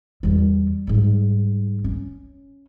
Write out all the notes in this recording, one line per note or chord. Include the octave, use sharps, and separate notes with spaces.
E2 G3
G#2 G3
C#4